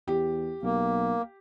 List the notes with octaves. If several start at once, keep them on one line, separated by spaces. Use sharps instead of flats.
E2 G4
B1 A#3